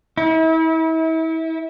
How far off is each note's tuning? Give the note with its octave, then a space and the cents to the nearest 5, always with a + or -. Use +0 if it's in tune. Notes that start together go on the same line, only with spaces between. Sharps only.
E4 -35